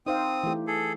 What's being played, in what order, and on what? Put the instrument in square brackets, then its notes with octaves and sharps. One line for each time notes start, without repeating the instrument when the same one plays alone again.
[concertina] C4 D#6 [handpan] D#4 C5 F5
[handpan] E3 A3 G4
[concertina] G#4 A4